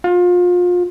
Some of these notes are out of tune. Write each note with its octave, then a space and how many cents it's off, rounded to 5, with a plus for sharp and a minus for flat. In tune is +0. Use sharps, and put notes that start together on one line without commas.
F4 +30